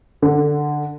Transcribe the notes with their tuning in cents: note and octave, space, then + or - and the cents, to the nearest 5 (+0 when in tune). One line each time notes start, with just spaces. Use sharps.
D3 +10